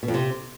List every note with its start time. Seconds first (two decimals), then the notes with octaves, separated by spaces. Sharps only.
0.03 B2
0.08 F2
0.14 C3